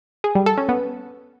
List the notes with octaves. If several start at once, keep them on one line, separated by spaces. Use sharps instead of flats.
G#4
G3
A4
C#4
B3